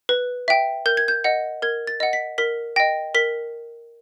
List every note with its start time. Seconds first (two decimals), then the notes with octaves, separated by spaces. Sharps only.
0.09 B4
0.48 E5 G5
0.86 A#4 G6
0.97 G#6
1.08 G6
1.24 D#5 F#5
1.62 A#4 G#6
1.87 A6
2.00 D#5 F#5
2.13 B6
2.38 A#4 B6
2.76 D#5 G5 A#6
3.15 A#4 B6